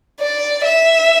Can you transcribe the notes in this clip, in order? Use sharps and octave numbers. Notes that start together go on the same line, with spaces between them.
D5
E5